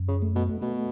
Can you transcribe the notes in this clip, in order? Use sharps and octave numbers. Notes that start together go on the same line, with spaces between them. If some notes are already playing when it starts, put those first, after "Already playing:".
Already playing: F#2
C#3
A3
B2
B2 A3